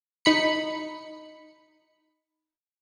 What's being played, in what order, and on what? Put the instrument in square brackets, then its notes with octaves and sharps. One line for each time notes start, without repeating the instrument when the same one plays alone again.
[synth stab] D#4 B5 C#7